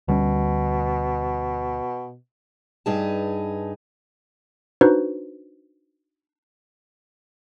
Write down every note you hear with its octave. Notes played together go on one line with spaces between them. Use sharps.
D2 B2 G3 C#4
G2 D#4 G#4 B4 A5
D4 D#4 F#4 B4 C5